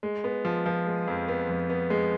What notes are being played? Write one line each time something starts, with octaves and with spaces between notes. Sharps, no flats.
G#3
B3
F3
F3
G#3
F2
B3
F2
B3
G#3